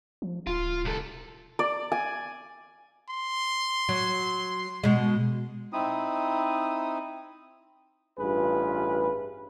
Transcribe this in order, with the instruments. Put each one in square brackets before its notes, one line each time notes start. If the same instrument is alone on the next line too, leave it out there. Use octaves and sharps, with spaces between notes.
[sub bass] F3
[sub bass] D1 [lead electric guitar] F4
[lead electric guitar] C2 A4
[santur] D5
G#5
[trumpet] C6
[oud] F#3
B2 G#3
[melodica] C4 D#4 E4 D#6
[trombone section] A1 G2 F4 G#4 B4